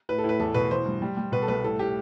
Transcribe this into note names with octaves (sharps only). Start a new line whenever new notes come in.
A2 B4
A4
A2
B4
E2 A4
B2 B4
E3 C5
G2
G3
G3
B2 B4
A4
C2 B4
A2 A4
A2 G4